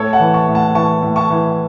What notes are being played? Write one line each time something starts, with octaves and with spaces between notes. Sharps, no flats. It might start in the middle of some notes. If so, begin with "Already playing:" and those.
Already playing: A2 A4 C#5
F#5 A5
E3
A5 C#6
A2
F#5 A5
E3 A5 C#6
A2
A5 C#6
E3